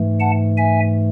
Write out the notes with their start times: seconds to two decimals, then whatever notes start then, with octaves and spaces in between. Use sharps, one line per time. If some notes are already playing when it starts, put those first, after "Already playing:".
Already playing: G#2 E3 A3
0.20 F#5 A5
0.57 E5 G#5